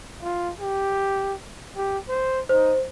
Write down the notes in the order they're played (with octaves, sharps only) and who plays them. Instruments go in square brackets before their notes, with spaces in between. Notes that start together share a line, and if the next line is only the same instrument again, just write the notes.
[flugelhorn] F4
G4
G4
C5
[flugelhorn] D#4 [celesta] C5